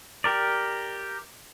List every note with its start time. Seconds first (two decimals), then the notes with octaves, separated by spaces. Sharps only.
0.24 G4 A#4 D5